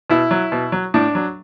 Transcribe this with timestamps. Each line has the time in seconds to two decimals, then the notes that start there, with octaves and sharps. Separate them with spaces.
0.10 B2 E4
0.31 F#3
0.52 B2
0.72 F#3
0.94 A2 D4
1.15 F#3